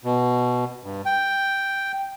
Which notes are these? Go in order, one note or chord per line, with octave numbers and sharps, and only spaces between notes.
B2
G2
G5